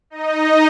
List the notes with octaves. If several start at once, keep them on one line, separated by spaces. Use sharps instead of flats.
D#4 D#5